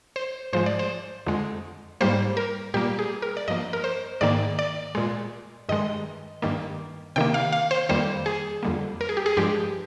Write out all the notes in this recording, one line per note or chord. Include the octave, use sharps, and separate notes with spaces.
C5
G#2 F3 G#3 C5
D5
C5
F2 D3 G#3
G#2 G3 A#3 C5
A#4
A#2 G3 A#3 G4
G#4
A#4
D5
G2 F3 A#3 D#5
A#4
C5
G#2 D#3 A#3 D5
D5
A#2 G#3
G2 D#3 G#3 D#5
G2 D#3 A#3
C3 D#3 A#3 G5
F5
F5
C5
F2 D#3 G3 A#3 C5
G#4
F2 D3 G3 A#3
A#4
G#4
G4
G#4
G2 F3 G#3 G4